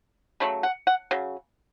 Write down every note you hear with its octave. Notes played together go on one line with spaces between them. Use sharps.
C#3 F#3 A3 B5
F#5
F#5
C#3 F#3